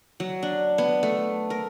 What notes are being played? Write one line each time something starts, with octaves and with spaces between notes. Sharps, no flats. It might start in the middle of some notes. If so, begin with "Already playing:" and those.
F#3
D4
B3
A3
A#4